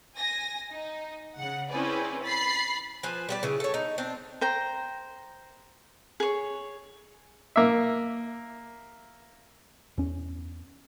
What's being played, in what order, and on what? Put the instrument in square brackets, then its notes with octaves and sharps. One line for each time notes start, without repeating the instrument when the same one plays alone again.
[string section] G#5 A#6
D#4
C#3 F#5
C4 C#4 E4 G#4 B4 D5
B5 A6 C7
[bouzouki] F3 B4 C5 G#5
G3 G4 D5
C#3 E3
A4 C#5
D#4
C4 D4
[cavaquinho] C5 G5 A#5
G#4 C#5
[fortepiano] A#3 E5
[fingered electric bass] E2 C#4